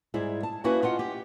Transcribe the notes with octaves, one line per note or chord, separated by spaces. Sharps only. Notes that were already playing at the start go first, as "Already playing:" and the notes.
G#2 G3 E4 G#4
A5
A#3 C#4 E4 F#4 B4
F4 D#5 F#5
G4